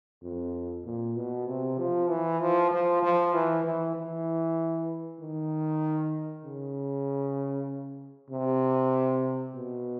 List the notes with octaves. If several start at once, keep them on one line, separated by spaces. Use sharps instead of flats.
F2
A#2
B2
C3
F3
E3
F3
F3
F3
E3
E3
E3
D#3
C#3
C3
B2